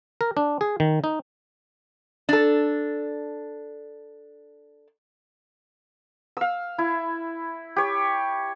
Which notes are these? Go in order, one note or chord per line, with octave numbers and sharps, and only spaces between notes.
A#4
D4
G#4
D#3
D#4
D4 A4
F5 E6
E4
G4 C#5